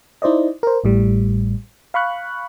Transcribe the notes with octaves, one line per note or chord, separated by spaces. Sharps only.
D#4 E4 C5 D5 D#5
A#4 C5
A1 A2 G3
F5 B5 C#6 F#6